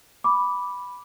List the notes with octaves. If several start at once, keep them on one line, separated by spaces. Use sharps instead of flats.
B5 D6